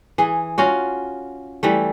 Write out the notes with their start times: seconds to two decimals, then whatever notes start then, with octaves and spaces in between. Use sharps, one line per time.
0.18 E3 G#4
0.58 C#4 F4 F#4
1.63 E3 G3 A3